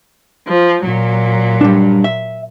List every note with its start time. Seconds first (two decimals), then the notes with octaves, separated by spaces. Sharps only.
0.48 F3
0.84 A#2 F#3
1.61 G3 D4
2.04 E5